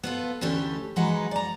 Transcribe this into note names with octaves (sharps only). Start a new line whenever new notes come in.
B3 F4 A4
D2 E3 A3 C#4 G4 A4
E3 F#3 G#3 D#4 B4 F#5
D5 A#5